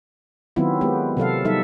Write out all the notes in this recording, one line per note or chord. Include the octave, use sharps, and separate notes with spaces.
D#3 F#3 B3 C4 E4 F4
G#3 B3 G4
C3 F#3 A4 F5
F#3 G3 D#4 A4 E5